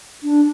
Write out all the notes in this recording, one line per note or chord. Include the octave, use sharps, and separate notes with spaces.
D4